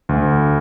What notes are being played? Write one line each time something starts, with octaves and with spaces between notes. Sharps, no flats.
D2